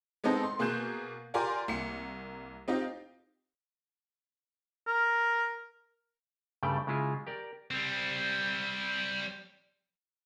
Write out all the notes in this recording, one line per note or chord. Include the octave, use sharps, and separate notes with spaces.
G#3 B3 C4 D#4 A4
C6
B2 A#3 G#4 F#6 G6 E7
F4 G4 A#4 D5 G#5 C6
C2 A#3 C#7
C4 D#4 F4 G4
A#4
G2 C#3 G3 A3 D5 G5
C#3 G#3 E4 F4
G4 A#4 D5
G3 C4